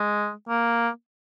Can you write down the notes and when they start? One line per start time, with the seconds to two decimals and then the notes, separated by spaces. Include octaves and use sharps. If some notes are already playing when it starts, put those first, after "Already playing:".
Already playing: G#3
0.49 A#3